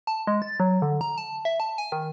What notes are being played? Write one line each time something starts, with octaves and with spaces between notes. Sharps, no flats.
A5
G#3
A6
F#3
D3
A#5
A5
E5
A5
G#5
D#3